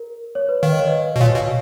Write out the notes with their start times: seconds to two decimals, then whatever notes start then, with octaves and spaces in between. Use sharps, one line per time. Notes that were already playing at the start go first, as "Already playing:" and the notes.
Already playing: A#4
0.35 C#5
0.49 B4
0.63 D#3 F5
0.72 D#5
0.79 C#5
0.87 B4 D#5
1.16 B2
1.20 A#2 C#5 F5
1.34 B2